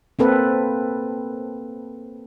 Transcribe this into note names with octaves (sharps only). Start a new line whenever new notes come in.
A#3 C4 A4 B4